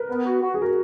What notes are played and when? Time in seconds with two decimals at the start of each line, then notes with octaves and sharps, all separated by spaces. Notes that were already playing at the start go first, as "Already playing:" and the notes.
Already playing: A#4 B4
0.08 B3
0.25 F#4
0.42 F#4
0.54 G#4
0.59 F#4 A#4